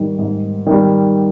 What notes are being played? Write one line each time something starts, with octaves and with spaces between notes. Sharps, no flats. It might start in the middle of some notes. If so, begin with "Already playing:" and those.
Already playing: G#2 D#3 G3
G#2
D#3 G3